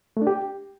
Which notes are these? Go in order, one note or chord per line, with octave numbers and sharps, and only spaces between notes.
A3
D4
G4